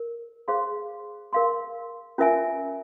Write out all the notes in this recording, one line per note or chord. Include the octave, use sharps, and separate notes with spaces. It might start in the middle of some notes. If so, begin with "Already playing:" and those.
Already playing: A#4
G#4 C5 F5 C6
A#4 F5 C6
C#4 F4 A#4 E5 G#5